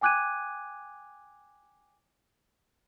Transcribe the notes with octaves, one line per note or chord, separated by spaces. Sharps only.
G5 G#5 D6 F#6 G#6 D#7